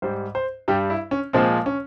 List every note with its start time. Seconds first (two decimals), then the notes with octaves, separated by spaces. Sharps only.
0.02 G#2 G3 C5
0.35 C5
0.68 G2 G3 G4
0.90 E4
1.11 C#4
1.33 A#2 F3 G#3 C4
1.66 C#4